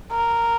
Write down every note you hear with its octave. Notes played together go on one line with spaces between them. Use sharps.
A#4